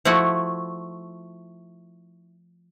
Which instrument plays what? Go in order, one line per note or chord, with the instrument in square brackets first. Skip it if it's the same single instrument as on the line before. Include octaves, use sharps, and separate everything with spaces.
[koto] F3 A3 E4 F#4